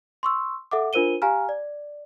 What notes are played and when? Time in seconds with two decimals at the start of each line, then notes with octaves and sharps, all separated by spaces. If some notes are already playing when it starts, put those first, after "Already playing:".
0.23 C6 C#6 E6
0.71 A4 E5 F#5 D6
0.93 D4 F4 A#4 C5 D#7 G7
1.22 G4 F5 G#5 A#5 F6
1.49 D5